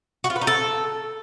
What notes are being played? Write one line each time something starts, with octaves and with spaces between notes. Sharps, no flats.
F#4
F4
B4
D#4
A4